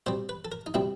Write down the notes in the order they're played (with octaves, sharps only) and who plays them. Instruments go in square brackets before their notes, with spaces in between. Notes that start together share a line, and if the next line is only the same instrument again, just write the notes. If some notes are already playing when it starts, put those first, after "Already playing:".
[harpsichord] B2 G3 C4 C5
B4
A4
A#4
D#4
B2 G3 C4 E4